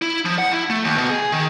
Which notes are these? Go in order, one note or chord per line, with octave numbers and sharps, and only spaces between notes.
E4
F3
F#5
E4
A3
D#2
B2
G#4
D#3